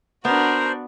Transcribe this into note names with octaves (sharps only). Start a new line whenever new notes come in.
B3 D4 F#4 A#4 C5